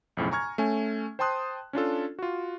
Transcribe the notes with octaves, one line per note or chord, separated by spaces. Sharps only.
B1 F2 A2 C#3
G#5 A#5 C#6 F6 G#6
A3 C#4 G#5
C5 G5 A5 C6 D#6 F#6
C#4 D4 F4 A4
F4 F#4